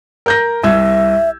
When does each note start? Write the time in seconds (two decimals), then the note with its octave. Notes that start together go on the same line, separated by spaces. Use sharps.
0.26 A#4 G6 A#6
0.64 C2 E5 E6 G#6